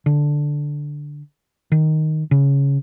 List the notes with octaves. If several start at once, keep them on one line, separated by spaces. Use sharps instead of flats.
D3
D#3
C#3